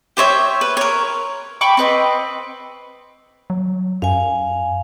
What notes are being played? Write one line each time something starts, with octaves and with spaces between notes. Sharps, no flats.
G4 C5 C#5 E5
B4
A#4 C#5
G5 B5 C#6 D6
C4 B4 D#5
F#3
F#2 F5 G#5